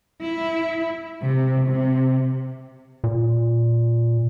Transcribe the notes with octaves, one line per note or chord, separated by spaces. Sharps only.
E4
C3
C3
A#2